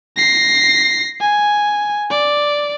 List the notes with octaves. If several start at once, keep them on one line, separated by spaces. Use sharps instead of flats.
A#6 C7
G#5
D5